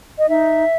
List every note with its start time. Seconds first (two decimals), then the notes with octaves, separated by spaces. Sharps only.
0.19 D#5
0.28 D#4 E5